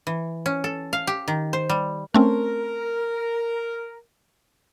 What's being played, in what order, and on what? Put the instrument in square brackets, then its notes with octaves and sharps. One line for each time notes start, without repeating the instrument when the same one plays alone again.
[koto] E3
C#4
A4
F5
G4
D#3
C5
G3
[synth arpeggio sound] A3 C4 C#4 [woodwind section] A#4